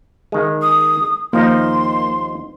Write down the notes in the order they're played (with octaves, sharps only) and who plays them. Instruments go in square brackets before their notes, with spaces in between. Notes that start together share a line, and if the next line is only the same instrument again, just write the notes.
[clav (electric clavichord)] D#3 G#3
[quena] D#6
[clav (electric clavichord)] D#2 F3 D#4 [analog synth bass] A#3 [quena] C6